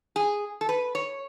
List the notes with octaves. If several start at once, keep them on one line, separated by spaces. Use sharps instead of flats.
G#4
A4
B4
C#5